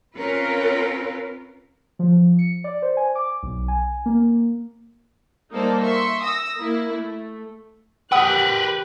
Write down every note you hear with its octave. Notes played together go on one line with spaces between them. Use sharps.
C4 C#4 F4 A#4 B4
F3
C#7
D5
C5
G#5
D6
B1
G#5
A#3
G3 A#3 D#4 A4 C5 D5
E5 C6 C#6
D#6 E6 A#6
A#3 E4
A3
G4 A#4 B4 F#5 D#6 F#6